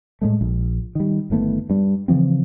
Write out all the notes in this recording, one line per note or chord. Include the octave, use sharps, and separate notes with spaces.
A2 G#3 A3
A#1
D#3 G3
G1 D#3 A3 B3
G2 G3
C#3 E3 F3 C4